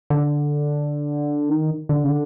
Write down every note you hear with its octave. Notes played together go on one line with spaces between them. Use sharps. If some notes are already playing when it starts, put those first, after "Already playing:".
D3
D#3
D3
C#3
D3